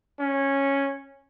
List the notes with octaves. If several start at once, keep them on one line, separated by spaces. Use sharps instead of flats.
C#4